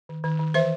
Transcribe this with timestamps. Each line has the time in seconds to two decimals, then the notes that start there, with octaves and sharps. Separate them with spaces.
0.09 D#3
0.24 D#3
0.39 D#3
0.54 E3 C5 E5